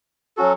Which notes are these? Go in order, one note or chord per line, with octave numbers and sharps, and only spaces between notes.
F#3 C#4 F#4 A4